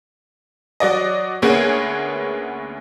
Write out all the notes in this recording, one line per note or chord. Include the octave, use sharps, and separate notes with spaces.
F#3 D5 D#5
D2 A#3 B3 C#4 G#4 G#6